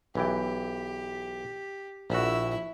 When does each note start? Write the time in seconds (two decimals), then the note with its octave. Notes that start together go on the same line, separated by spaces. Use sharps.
0.15 B1 E3 G4 G5
2.10 A#1 E4 F#4 E6